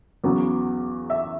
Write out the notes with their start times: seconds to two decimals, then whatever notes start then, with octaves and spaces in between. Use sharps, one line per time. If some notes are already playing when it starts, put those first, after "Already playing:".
0.24 E2 C#3 F#3 B3
1.10 E5